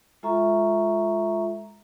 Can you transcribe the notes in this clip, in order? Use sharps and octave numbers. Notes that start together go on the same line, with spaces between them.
G#3 F4 A4 E5 A#5 C#6